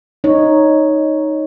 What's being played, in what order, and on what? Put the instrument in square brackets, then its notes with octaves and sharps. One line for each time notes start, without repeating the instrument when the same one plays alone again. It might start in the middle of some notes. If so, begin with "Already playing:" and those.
[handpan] D#4 C#5